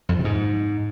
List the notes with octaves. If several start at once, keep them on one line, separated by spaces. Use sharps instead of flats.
F2
F3
C3
G#2